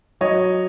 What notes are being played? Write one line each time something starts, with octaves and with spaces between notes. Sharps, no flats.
F#3 C#5 D#5